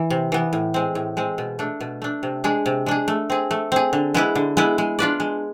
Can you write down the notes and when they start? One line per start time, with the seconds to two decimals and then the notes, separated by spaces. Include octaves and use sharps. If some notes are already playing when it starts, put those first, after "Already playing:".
Already playing: E3
0.10 C3
0.32 E3 B3
0.53 A2
0.74 G#3 C4
0.95 A2
1.17 G#3 C4
1.38 B2
1.59 A3 D4
1.80 B2
2.02 A3 D4
2.23 C3
2.44 G#3 D4 G#4
2.66 C3
2.86 G#3 D4 G#4
3.08 A3
3.30 C4 G#4
3.51 A3
3.72 C4 G#4
3.93 D3
4.14 G#3 B3 E4 B4
4.35 D3
4.57 G#3 B3 E4 B4
4.78 G#3
4.99 D4 F4 B4 D5
5.20 G#3